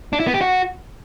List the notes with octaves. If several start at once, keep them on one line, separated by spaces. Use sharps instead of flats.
D4
E4
B3
G4
F#4